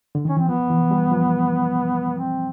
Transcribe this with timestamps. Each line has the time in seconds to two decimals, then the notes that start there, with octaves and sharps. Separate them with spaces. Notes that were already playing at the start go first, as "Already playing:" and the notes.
0.15 D3
0.25 D#3 C#4
0.37 E3 C4
0.48 F3 B3
0.70 E3
0.91 G3
1.12 F3
2.18 C4